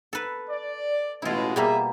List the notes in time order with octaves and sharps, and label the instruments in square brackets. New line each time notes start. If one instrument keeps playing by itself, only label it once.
[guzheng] A4 B4
[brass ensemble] D5
[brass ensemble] A1 B2 G#3 [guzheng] E4 F4
[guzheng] B2 G3 A#3 [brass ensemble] G#4 E5